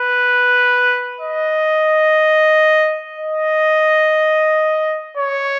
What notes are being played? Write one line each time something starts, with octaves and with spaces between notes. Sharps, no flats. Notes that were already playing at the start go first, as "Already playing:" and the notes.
Already playing: B4
D#5
D#5
C#5